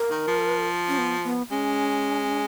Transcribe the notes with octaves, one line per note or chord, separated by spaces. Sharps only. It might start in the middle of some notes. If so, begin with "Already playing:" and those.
Already playing: A#4
D#3
F3
C#4
B3
B3
G#3 C#4